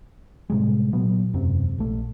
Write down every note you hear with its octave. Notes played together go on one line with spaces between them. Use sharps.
A2 C3 G3 G#3
A#2 F#3 B3
E1 F#2 C3 C4
A#1 A3